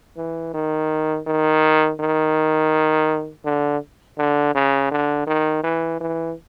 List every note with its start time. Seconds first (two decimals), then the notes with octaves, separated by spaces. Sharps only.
0.17 E3
0.54 D#3
1.27 D#3
1.99 D#3
3.44 D3
4.18 D3
4.55 C#3
4.91 D3
5.27 D#3
5.63 E3
6.00 E3